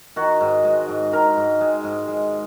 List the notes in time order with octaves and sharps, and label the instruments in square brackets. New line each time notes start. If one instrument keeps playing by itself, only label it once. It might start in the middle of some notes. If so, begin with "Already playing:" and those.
[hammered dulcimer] D#3 F#4
G#2
G#3
G#2
D#3 A#4
G#2
G#3
G#2
G#3